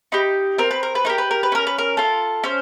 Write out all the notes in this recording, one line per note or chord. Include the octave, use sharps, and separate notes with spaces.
D#4 G4 B4
C4 A#4
B4
A#4
B4
D#4 G4 A#4
B4
A#4
B4
C#4 A#4
B4
A#4
F4 A4
C#4 C5